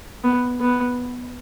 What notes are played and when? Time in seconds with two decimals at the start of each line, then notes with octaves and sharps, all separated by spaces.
0.24 B3
0.61 B3